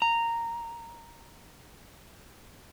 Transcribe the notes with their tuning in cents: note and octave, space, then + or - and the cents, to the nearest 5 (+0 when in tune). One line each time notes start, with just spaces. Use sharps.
A#5 -10